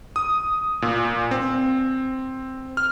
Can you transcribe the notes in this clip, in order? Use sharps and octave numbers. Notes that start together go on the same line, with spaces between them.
D#6
A#2
C4
F6